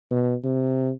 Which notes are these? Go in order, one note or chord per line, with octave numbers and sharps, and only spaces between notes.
B2
C3